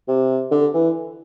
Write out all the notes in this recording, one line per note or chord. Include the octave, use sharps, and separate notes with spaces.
C3
D3
E3